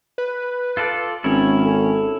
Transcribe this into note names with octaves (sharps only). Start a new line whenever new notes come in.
B4
F4 A4 D5
G#1 C#4 E4 C#5
A4